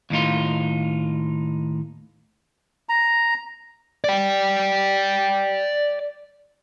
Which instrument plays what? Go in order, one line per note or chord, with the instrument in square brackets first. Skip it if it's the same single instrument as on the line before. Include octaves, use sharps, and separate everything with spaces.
[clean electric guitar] D#2 A2 D#4 F4
[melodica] A#5
[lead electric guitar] D5 G5